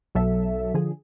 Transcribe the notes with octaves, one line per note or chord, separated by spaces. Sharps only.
B1 F#3 A4 E5
D3 F3 G#4